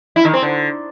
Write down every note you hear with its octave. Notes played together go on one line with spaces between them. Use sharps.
E4
D#3
C4
D3